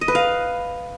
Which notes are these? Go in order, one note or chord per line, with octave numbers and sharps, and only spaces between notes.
D#5
B4
F5